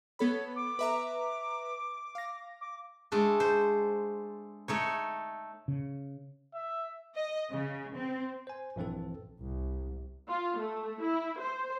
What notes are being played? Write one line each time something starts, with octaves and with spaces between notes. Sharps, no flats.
B3 A4 C#5 B5
D6
B4 E5 A#5
F5 A#6
D6
G#3 A3 D4
C5
A3 D#4 C#5
C#3
E5
D#5
C#3
C4
C5 G#5
A#1 G2 E3 C4 A4
C2
F4
A3
E4
C5